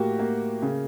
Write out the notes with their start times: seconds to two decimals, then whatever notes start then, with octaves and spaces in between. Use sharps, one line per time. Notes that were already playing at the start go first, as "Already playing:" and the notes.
Already playing: A2 A#3 F#4 G4
0.19 A#3
0.62 C#3